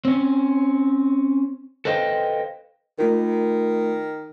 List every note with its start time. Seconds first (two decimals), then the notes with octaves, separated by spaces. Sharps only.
0.05 C4 C#4
1.85 A4 B4 C5 D#5 F5 G5
2.99 D#3 A3 F4 A#4